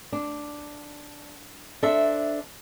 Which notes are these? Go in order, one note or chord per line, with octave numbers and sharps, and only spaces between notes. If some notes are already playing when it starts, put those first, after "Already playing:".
D4
D4 A4 C5 E5